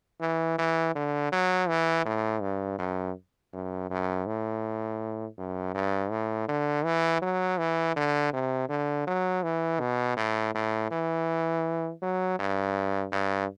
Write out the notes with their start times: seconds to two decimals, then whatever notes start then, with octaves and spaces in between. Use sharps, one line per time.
0.21 E3
0.58 E3
0.95 D3
1.32 F#3
1.68 E3
2.06 A2
2.42 G2
2.79 F#2
3.53 F#2
3.90 F#2
4.26 A2
5.38 F#2
5.75 G2
6.11 A2
6.48 D3
6.85 E3
7.22 F#3
7.58 E3
7.96 D3
8.33 C3
8.69 D3
9.07 F#3
9.43 E3
9.80 B2
10.17 A2
10.55 A2
10.91 E3
12.02 F#3
12.39 G2
13.12 G2